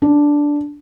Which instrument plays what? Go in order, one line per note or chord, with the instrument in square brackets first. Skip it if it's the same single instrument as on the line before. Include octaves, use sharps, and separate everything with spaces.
[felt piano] D4